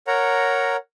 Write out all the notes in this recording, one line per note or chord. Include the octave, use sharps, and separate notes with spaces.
A#4 C#5 F#5 A#5